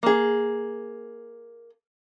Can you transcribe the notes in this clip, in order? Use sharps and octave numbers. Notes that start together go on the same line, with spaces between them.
A#3 G#4